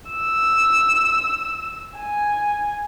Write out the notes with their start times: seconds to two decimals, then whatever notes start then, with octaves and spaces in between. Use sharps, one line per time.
0.10 E6
1.98 G#5